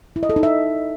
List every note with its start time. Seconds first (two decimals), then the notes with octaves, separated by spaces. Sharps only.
0.16 E4
0.23 D#5
0.30 A4
0.36 D#4
0.43 E5